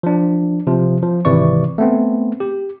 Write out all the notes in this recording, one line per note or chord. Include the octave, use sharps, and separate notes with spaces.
F3 D4
C3 F3
F3
G#1 C3 E3 D5 C#6
A3 B3 C4
G4